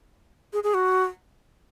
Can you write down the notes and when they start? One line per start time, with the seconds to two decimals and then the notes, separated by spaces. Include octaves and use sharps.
0.53 G#4
0.63 G#4
0.74 F#4